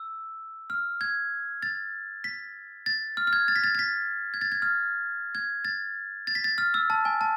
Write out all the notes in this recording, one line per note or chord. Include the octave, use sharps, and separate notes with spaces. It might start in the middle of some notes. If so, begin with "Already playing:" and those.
Already playing: E6
F6
G#6
A6
B6
A6
F6
F6
G#6
A6
B6
A6
A6
B6
G#6
A6
G#6
F6
G#6
A6
A6
B6
A6
F6
E6
A5
G#5
A5